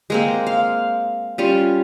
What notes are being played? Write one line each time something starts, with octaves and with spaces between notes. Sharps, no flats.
G#3 A#3 C4
F5
G3 C#4 F4